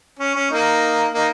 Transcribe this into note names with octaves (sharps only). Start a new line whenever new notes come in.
C#4
C#4
A#3 D#4
A#3 D#4